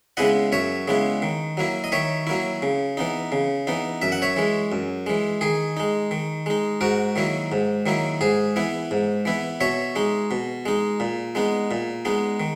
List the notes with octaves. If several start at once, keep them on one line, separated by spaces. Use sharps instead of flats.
C#3 G#3 B3 E4 D#5 F#5
F#2 C#5 E5
C#3 G#3 B3 E4
D#3
F#3 A#3 E4
D#5
D#3 C#5 E5
F#3 A#3 E4
C#3
E3 B3 D#4
C#3
E3 B3 D#4
F#2 E5
F#5
C#5 E5
E3 G#3
F#2
E3 G#3
D#3 G#4
G#3 D#4
D#3
G#3 D#4
G#2 F#4 A#4
D#3 F#3 A#3 E4
G#2
D#3 F#3 A#3 E4
G#2 G#4
E3 B3 E4
G#2
E3 B3 E4
B2 C#5 E5
G#3 D#4
B2
G#3 D#4
A#2
G#3 B3 D#4
A#2
G#3 B3 D#4
D#3